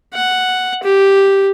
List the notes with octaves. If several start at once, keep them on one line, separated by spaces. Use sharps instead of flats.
F#5
G4